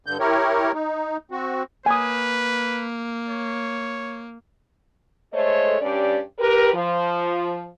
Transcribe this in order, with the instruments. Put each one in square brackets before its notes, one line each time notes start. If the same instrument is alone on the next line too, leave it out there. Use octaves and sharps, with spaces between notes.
[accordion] G2 D3 G6
E4 G4 A#4 C#5
D#4
C4 F#4
[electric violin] A#3 [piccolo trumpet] B4 [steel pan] G#5 D#6
[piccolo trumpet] C#5
[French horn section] G#3 A3 A4 C5 C#5 D#5
G2 C#4 G4 D5
G4 A#4 B4
F3